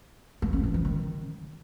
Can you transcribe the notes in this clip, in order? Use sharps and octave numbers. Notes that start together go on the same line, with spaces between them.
A3
C#4
E3
F3
D#3